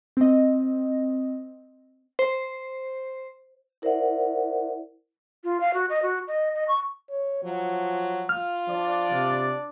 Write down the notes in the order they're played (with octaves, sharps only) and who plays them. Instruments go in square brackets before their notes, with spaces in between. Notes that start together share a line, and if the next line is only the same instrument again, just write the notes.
[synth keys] C4 D#5
[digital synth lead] C5
[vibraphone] E4 A#4 C5 D5 E5 F#5
[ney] F4
F5
F#4
D#5
F#4
D#5
D#5
C#6
[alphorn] C#5
[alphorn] F3 [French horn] F#3
[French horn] F4 [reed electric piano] F6
[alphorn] F3 [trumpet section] D4 D5
[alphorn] C3